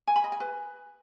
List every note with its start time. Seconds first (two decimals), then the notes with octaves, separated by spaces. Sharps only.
0.07 G#5
0.16 B5
0.24 D#5
0.32 G#5
0.40 B4